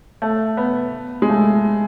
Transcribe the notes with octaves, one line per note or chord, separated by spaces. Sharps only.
A3
B3
G#3
A3